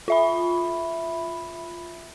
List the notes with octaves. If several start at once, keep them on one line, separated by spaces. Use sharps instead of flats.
F4 E5 B5